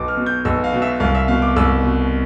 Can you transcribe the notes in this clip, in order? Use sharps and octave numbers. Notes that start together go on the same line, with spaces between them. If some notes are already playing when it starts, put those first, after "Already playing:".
Already playing: B1 D6
F6
B2
G6
B1 E6
F5
B2
E5
C2 F5
E5
B2 F5
D6
C2 E6
B2